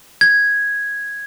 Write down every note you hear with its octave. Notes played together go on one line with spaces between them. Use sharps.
G#6